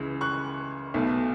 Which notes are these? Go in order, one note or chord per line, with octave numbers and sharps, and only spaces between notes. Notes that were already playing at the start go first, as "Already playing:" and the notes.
Already playing: C#2 C#3 E3
C#6 F#6
B1 B2 A3